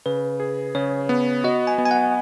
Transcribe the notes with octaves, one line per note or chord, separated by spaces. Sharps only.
C#3 B4
G#4
C#3 C#5
B3
F#4 D#5
G#5
B3
G#5
F#5